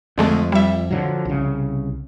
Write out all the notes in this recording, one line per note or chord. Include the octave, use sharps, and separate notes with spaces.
F2 D3 G#3 A3
G3 E5
D3 F3 F#3
C2 C#3